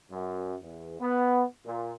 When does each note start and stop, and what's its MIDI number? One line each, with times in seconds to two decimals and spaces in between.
0.10 0.55 42
0.61 0.96 40
0.99 1.42 59
1.64 1.92 46